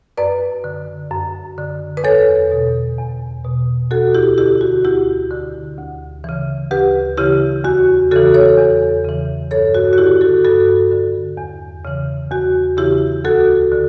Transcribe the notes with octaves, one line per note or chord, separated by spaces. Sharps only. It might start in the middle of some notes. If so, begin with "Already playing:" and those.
F#2 B4 D5
D3
F#2
D3
B4
E2 A4 C#5
B2
E2
B2
D2 F#4 A4
E4 G4
D3 E4 G4
F#4
D2 E4 G4
D3
D2
C#3 E3
D2 G4 B4
C#3 E3 E4 G4
E2 F#4
C#3 E3 F#4 A4
A4 C#5
E2
C#3 E3
G2 A4 C#5
F#4
F#4
D3 E4 G4
F#4 A4
G2 F#4 A4
D3
E2
C#3 E3
E2 F#4
C#3 E3 E4 G4
D2 F#4 A4
D3